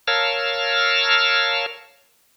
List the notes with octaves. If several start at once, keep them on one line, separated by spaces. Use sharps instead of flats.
A#4 C#5 F5 A5 E6 F6